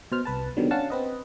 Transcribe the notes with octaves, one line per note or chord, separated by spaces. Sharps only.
B2 C5 F6
C2 B4 A5
B2 D3 D#3 F#3 G3
C#4 D4 F5 F#5 A5
C4 B4 D#5